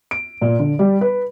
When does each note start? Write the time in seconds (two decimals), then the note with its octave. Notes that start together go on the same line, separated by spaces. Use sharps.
0.11 D7
0.41 A#2
0.59 D3
0.79 G3
1.01 B4